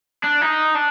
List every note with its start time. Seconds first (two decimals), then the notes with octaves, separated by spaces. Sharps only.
0.24 D4
0.42 D#4
0.75 D4